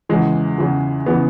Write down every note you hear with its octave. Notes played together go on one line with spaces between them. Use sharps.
E2 C#3 E3 G#3
E2 C#3 E3
C#3 E3 B3